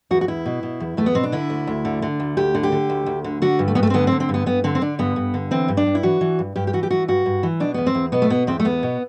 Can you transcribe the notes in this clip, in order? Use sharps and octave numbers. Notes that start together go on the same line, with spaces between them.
E2 F#4
F#4
E2 E4
B2
B2
E2
E2 A3
B3
B2 C4
D4
D3 E4
D2
D2
D3
D3
D2
D2 G4
D3
G4
D3
D2
D2
D3
D3 F#4
G2
A3
G2 B3
A3
C4
D3 B3
C4
D3
C4
G2
B3
G2 B3
D3 C4
C4
D3 D4
G2 B3
G2
D3
E3 C4
G2
D4
G2
E4
E3 F#4
E3
G2
G2 G4
G4
E3 F#4
G4
E3 F#4
G2 F#4
G2
E3
B2 D4
E2 B3
C4
E2
B2 B3
A3
B2 B3
E2 C4
A3
E2 B3
B2